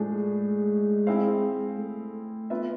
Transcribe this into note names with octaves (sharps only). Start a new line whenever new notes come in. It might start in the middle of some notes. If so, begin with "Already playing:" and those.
Already playing: A2 F3 G#3 A3 D4 G#4
C4 E4 G#4 C5 F5
A3
B3 F4 B4 E5